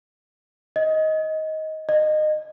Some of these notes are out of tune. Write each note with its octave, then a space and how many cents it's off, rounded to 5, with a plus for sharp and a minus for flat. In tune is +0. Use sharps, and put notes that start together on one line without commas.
D#5 +15
D#5 -20